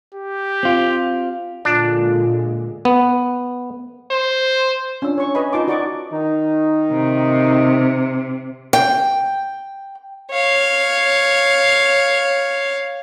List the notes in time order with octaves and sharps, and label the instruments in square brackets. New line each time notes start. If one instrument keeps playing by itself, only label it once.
[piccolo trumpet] G4
[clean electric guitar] C4 F4
[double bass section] A#2 D3 G#3 [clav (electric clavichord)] D4 [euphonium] F4
[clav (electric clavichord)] B3
[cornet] C5
[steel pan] C#4 D4 F4 E6
C#5 C#6
B4 C#5 D#5 G#5 B5
D#4 F4 A5 B5 C6 D6
F#4 D5 D#5 C#6 D6
[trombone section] D#3 D#4
[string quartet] C3
[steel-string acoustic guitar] G5
[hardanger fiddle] C#5 F5